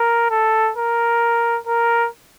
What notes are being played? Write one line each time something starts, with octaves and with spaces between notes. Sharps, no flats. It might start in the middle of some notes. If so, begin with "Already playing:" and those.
Already playing: A#4
A4
A#4
A#4